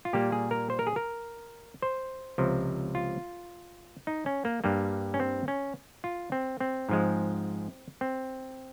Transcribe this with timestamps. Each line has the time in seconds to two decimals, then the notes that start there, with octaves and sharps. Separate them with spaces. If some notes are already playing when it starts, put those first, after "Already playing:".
0.05 F4
0.13 A#2 G3 A#3 G4
0.32 G#4
0.51 A#4
0.70 C5
0.79 A#4
0.87 G#4
0.96 A#4
1.82 C5
2.38 C#2 C3 F3
2.95 F4
4.07 D#4
4.26 C#4
4.45 A#3
4.64 G2 G3 A#3
5.14 C#4
5.20 C4
5.48 C#4
6.04 F4
6.32 C4
6.60 C4
6.89 G#2 F3 G#3
8.01 C4